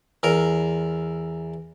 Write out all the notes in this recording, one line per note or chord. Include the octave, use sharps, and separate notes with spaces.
E2 A#4